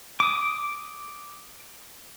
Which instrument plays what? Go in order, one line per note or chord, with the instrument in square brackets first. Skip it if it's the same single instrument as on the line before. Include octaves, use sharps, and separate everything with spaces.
[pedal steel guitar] D6 D#6